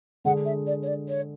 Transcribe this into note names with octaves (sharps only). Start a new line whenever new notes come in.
D3 G#3 D4 G#4 F#5
E5
D5
C#5
D5
C#5